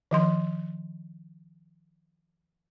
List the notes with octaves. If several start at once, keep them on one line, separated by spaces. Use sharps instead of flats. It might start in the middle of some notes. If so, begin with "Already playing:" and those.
D#3 F3 C6